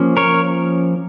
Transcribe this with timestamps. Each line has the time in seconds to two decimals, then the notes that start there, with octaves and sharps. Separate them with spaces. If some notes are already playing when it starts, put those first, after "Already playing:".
Already playing: F3 A#3 C#4
0.17 A#4 C#5